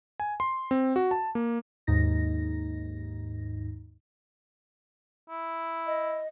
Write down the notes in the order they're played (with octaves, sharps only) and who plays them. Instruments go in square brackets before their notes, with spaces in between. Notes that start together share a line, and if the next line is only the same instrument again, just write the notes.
[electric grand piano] G#5
C6
C4
F#4
A5
A#3
[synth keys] D#2 G#2 D#4 A#6
[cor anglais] E4
[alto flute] D#5